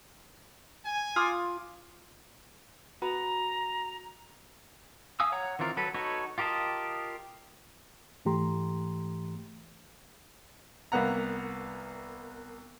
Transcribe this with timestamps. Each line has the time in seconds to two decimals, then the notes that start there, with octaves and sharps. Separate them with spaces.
0.86 G#5
1.16 F4 D6 D#6
3.02 F#4 B4 A#5
5.20 F5 G#5 D#6 E6
5.32 C#5 F#5 A#5
5.59 D#3 E3 C4 F4 A#4
5.77 F#3 A4 B4
5.94 D#4 F#4 A4 B4 C#5
6.38 F4 G4 A#4 D#5 A5
8.25 G#2 E3 A3 G4 A#5 C6
10.92 C2 A#3 B3 F#5 A#5